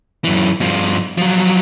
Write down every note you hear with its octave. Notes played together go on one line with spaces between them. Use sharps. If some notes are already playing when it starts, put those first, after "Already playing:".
F#2 E3
G2 F3
F3 F#3